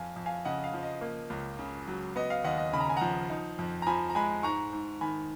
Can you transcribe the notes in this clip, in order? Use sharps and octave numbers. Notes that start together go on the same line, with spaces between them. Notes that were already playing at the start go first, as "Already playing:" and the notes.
Already playing: F2 F5 G#5
F2
F5 G#5
C#3 D#5 F#5
F5
F3
D#5
A#3
C#2
C#3
F#3
B3 D#5
F5
D#2 D#5 F#5
D#5
C#3 B5
A#5
G#5
F3 F#5 A#5
D#4
F2
A#5
F3 G#5 B5
A#5
G#3 G#5 B5
G#2 A#5 C#6
G#2
D#3 G#5 B5